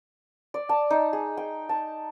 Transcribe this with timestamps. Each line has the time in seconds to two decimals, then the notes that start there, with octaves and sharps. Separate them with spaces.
0.54 D5
0.69 A5
0.90 D#4
1.13 G#4
1.37 G5
1.69 A5